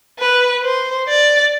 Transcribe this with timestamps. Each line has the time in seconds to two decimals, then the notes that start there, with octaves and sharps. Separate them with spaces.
0.19 B4
0.63 C5
1.08 D5